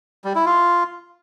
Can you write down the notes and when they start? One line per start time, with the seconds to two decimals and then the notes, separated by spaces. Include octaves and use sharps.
0.24 G3
0.35 E4
0.46 F4